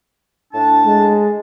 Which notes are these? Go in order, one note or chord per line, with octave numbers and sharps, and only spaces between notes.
A2 D4 A5
G#3